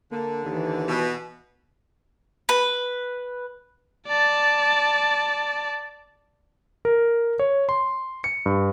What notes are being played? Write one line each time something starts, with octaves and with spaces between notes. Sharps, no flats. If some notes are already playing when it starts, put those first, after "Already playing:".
D3 A#3
D#2 E3
B2
B4
D5 A5
A#4
C#5
C6
C#7
G2